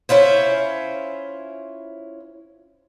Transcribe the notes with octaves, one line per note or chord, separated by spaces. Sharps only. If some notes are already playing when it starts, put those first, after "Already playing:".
C#4 E4 F4 C5